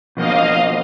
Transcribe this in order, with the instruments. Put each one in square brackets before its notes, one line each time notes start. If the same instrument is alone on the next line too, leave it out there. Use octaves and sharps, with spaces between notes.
[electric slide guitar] B2 F3 A#3 [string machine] D#5 F5